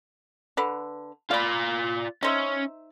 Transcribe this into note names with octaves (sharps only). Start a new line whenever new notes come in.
D3 B4
F4 D5 F5 B5
C#4 D#4 C5 E5